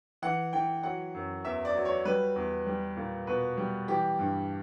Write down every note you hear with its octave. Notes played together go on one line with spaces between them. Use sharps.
E3 F#5
E3 G5
F#3 F#5
F#2
E2 E5
D5
F#3
C#5
G3 B4
E2
G3
A#2
B2 B4
G3
E3 G4
G2